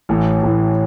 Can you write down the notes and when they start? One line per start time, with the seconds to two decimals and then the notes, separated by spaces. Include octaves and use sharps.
0.09 A1 A2 E3
0.43 A1 A2 E3